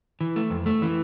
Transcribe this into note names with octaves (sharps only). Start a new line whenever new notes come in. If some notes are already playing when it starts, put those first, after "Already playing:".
E3
A3
F2
A3
E3